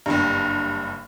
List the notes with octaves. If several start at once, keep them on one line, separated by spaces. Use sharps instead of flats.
F#1 G2